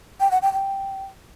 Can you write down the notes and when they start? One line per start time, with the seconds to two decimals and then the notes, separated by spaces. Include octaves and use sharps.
0.20 G5
0.31 F#5
0.42 G5
0.53 G5